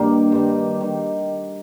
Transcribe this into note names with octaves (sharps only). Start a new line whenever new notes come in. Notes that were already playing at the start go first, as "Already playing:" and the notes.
Already playing: G2 D#3 A#3 G4
G2 D#3
D#3